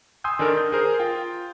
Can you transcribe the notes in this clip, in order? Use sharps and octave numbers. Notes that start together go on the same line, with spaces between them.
G#5 C6 D#6 E6 G6
D#3 D4 A4 A#4
G6
G#4 A#4 C5
F4 G5